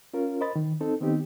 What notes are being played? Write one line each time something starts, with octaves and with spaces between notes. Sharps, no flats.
C#4 F4 A#4
A#4 C5 D#5 B5 A6
D#3
C4 D#4 A4
D#3 B3 C4 D#4 G4